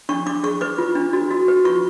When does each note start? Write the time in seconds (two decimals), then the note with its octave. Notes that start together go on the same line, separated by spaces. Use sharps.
0.09 D4 C#6
0.26 D4 D6
0.44 G#4 C#6
0.61 B4 D6
0.78 F4
0.95 D4
1.13 F#4
1.31 F#4
1.48 B4
1.65 F4 C#6